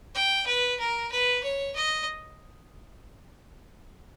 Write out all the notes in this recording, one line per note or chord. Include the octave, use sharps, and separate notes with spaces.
G5
B4
A#4
B4
C#5
D#5